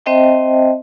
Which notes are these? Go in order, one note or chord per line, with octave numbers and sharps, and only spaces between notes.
C4 C5 D#5 E5 G5 A5